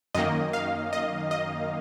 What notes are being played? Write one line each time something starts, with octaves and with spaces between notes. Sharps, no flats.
F#2 D#3 A#3 D#5
F5
D#5
D#5